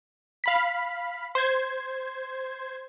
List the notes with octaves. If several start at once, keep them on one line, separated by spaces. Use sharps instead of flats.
F5 B5 B6
C5 G#6